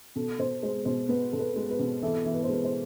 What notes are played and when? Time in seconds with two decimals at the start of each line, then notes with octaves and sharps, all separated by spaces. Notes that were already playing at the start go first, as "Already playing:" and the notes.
0.16 B2 A4
0.39 B2 C5
0.63 G#3 C5
0.85 B2 C5
1.09 B3 B4
1.33 B2 A4
1.40 B4
1.56 G#3
1.71 B4
1.79 B2
2.02 E3 A4
2.26 E3
2.34 B4
2.43 C5
2.49 G#3 B4
2.65 C5